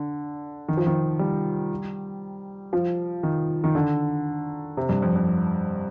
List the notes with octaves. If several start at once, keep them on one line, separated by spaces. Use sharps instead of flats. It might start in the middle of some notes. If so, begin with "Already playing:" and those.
Already playing: D3
D#3
F3
D#3
G3
F3
D#3
D#3
D3
C3
G2
F2
F2